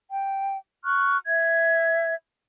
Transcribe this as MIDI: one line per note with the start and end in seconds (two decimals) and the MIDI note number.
0.11 0.56 79
0.84 1.17 85
0.84 1.17 89
0.84 1.17 90
1.27 2.14 76
1.27 2.14 92